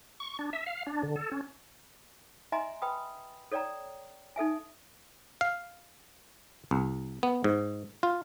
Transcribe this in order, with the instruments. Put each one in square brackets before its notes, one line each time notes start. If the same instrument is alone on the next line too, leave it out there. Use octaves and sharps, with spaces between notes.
[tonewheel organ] C#6
D4
E5
F5
D4
D3
A4
C#4
[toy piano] D#5 E5 G#5 A#5 C6
B4 G5 B5 D#6
A4 C#5 D5 G5 A#5
D#4 A4 E5 G#5
[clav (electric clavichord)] F5
C2
B3
G#2
F4